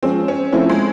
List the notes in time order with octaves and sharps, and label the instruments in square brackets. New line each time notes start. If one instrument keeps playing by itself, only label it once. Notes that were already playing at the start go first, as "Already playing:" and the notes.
[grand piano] F3 G#3 C#4 [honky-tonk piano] C4
[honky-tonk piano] C#4
[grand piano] F3 A3 C4 E4 [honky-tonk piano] C#4
[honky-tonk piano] G#3